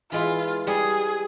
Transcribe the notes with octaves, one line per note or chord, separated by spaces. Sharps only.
E3 G#3 E4 F4
G3 G#4